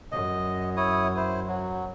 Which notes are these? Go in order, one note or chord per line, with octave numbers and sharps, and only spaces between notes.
F#2 D#5
E4 C#5 D#6
E4 C5
F#3